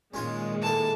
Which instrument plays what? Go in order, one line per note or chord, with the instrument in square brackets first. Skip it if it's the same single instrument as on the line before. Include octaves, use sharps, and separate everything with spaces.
[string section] A#2 D#3 G#3 [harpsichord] C#4 F4 G#5
[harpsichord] E3 A#3 A4 [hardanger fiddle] A5